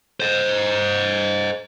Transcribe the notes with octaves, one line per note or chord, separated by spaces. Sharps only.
C5 D#5